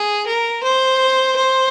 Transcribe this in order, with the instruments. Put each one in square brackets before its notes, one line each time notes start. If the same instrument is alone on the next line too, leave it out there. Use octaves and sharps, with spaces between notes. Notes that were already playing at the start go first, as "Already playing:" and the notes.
Already playing: [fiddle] G#4
A#4
C5
C5